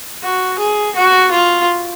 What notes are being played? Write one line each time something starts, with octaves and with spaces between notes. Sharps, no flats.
F#4
G#4
F#4
F4